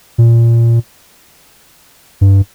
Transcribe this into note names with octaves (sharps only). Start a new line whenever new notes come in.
A#2
G2